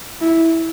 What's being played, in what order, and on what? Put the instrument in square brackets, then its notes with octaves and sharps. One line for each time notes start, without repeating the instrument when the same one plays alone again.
[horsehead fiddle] E4